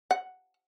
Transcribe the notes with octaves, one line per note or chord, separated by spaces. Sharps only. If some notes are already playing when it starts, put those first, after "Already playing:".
F#5